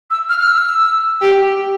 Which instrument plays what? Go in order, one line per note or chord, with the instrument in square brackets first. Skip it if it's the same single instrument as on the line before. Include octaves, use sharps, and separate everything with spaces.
[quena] E6
F6
F6
E6
[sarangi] G4